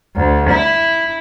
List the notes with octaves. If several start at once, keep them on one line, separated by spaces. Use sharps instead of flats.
D2
E4